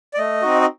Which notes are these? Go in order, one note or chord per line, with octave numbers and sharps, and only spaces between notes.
D5
A3 D#5
C4 D#4 F#4
D#5